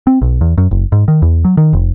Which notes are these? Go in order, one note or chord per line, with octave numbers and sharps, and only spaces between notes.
C4
B1
E2
F#2
F#1
G#2
D#3
E2
F#3
D#3
F1